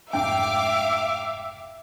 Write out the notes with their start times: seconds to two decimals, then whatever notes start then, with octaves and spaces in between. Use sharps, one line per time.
0.13 F1 G#2 D4 E5 F5 G5 D6